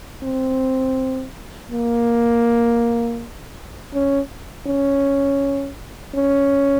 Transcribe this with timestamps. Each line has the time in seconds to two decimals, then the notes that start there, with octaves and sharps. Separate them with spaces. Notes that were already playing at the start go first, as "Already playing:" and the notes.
0.24 C4
1.71 A#3
3.94 C#4
4.67 C#4
6.15 C#4